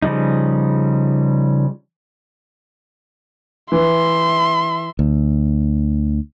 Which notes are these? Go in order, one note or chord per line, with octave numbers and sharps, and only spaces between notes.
C#3 F3 G3 D#4
E3 E5 C6
D2